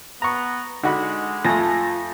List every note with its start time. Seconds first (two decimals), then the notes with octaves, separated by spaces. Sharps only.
0.22 B3 A#5 C#6
0.84 D3 G#3 D#4 F#4 B5
1.45 F2 A3 F4 G#5 A5 A#6